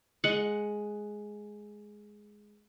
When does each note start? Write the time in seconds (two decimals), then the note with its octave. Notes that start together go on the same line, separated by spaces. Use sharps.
0.24 G#3 F#5